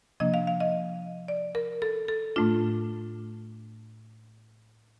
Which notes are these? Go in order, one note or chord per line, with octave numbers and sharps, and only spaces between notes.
C3 F3 A#3 D4 D#5
F5
F5
D#5
D5
A#4
A4
A4
A2 A3 D4 F4